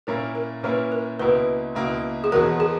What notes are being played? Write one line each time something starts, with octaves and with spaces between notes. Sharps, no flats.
A#2 A#3 C#4 E4 A#4
A#4
A#2 A#3 C#4 E4 B4
A#4
C#2 B2 A#3 E4 B4
C#2 B2 A#3 E4
G#4
E2 B2 F#3 A#4
G#4